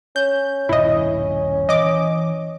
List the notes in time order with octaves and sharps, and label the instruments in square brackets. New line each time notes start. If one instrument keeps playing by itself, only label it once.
[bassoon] C#4 [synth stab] G6
[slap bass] D#1 G2 B2 [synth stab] E4 D#5
[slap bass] E3 [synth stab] D#5 D6